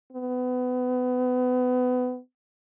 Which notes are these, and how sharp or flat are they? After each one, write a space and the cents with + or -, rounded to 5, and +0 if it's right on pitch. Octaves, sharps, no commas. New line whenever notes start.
B3 +25